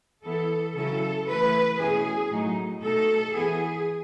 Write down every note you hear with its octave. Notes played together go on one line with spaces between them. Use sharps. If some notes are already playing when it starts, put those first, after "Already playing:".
E3 B3 E4 A4
C#3 F#3 C#4 E4 A4
E3 A3 E4 B4
B2 A3 C#4 E4 G#4
A2 F#3 A3 D#4
B2 A3 D#4 A4
E3 B3 E4 G#4